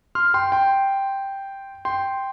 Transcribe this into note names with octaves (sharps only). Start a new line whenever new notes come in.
C6 F6
G5 C6
G5 C6
G5 C6